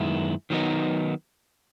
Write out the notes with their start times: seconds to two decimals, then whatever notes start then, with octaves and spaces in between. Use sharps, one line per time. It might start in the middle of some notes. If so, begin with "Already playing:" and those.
Already playing: F#2 D#3 G#3 B3 E4
0.50 D#3 F#3 B3 D#4